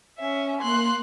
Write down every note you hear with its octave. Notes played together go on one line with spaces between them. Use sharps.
C#4 E5
A#3 C6 F#6